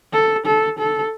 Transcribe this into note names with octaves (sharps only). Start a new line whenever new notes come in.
A4
A4
A4